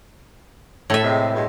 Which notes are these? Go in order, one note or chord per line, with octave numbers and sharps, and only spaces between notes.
A2 A4 E5
C3 G#3
G2 B2 G#3